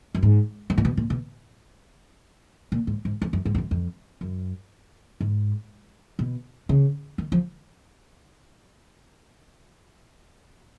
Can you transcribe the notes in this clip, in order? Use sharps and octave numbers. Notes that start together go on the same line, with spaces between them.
F#2
G#2
G#2
A#2
B2
A#2
B2
A#2
G#2
G#2
F2
F#2
G#2
F2
F#2
F2
F#2
G#2
B2
C#3
D#3
F3